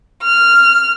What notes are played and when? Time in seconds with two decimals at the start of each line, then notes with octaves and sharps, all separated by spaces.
0.23 F6